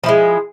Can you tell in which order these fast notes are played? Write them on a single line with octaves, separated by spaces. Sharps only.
F3 E4 G#3